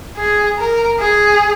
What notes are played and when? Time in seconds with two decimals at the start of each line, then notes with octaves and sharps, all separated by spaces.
0.17 G#4
0.59 A#4
1.00 G#4